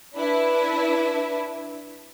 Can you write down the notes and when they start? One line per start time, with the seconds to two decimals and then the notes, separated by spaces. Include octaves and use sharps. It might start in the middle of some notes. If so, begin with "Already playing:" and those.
0.15 D4 E4 B4 E5